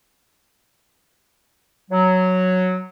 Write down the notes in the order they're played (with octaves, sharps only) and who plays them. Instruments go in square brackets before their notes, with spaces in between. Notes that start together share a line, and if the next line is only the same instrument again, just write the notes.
[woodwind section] F#3